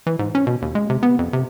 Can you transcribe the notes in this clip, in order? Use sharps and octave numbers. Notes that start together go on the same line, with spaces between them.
E3
G#2
C#4
B2
D#2
G#3
C3
B3
F2
C3